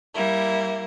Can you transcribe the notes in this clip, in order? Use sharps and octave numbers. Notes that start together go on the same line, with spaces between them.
G3 A#3 E4